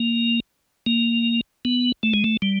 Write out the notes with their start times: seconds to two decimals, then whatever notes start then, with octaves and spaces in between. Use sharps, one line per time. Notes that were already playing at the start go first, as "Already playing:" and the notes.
Already playing: A#3
0.86 A#3
1.65 B3
2.03 A3
2.14 G#3
2.24 A3
2.42 G3